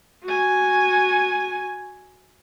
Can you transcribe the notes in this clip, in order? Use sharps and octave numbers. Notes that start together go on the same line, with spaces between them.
F#4 G#5